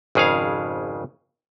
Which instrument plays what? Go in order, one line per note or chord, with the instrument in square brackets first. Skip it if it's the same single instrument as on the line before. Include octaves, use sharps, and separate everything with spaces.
[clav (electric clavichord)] G#1 F2 C#3 G#4 C#5 F5